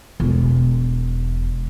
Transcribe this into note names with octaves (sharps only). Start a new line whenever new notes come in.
E1 G#3